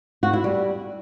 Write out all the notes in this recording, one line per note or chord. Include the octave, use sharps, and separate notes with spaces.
F#4
E4
G3